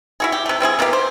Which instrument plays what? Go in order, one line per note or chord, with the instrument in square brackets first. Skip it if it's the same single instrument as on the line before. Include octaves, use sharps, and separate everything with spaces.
[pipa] E4 F#4 G#4
G4
C3 A3
G3 C4 E4 G#4
B2 A#3 C4 G4
C5